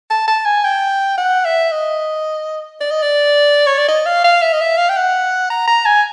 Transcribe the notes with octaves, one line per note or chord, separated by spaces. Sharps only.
A5
A5
G#5
G5
F#5
E5
D#5
D5
D#5
D5
C#5
D5
D#5
F5
F5
E5
D#5
E5
F5
G5
F#5
A#5
A#5
G#5